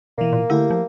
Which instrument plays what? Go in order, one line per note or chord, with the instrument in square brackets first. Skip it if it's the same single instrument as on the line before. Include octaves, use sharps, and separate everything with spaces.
[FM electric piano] B2 E3 [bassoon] A#3
[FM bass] A#2
[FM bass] D3 [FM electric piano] A3 E4 G4
[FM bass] F3